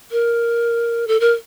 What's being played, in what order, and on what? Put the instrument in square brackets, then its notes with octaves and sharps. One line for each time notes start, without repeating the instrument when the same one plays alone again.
[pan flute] A#4
A4
A#4